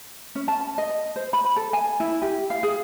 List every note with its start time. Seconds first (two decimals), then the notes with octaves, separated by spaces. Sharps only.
0.35 C#4
0.48 A5
0.78 D#5
1.16 C5
1.33 B5
1.56 A4
1.73 G#5
2.00 E4
2.22 G4
2.50 F5
2.63 G#4